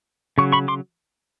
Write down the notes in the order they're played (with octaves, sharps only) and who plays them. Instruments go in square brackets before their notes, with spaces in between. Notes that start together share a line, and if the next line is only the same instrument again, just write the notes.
[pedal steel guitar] C#3 F#3 C#6
B5 C#6
C6 D6